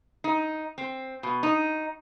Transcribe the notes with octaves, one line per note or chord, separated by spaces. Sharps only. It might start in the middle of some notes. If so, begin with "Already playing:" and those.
D#4
C4
B2
D#4